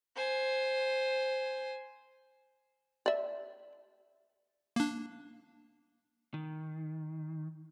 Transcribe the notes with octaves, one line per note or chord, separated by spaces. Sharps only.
C5 G#5
D5 E5
A#3 D4
D#3